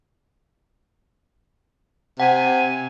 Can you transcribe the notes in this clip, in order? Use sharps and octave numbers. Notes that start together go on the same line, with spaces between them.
C3 F#5 G#5